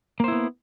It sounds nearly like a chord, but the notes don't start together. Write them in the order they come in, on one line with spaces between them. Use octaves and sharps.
A#3 C5 E4 B3